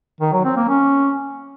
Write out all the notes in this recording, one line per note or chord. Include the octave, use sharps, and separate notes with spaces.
D#3
F#3
C4
A#3
C#4